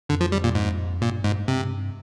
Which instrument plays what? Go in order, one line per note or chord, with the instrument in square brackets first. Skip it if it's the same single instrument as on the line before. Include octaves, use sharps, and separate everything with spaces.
[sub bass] F2 [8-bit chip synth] D3
[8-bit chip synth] F3
G3
A#2
G#2
[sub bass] G2 [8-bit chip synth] A#2
[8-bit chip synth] G#2
[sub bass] G2 [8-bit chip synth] C3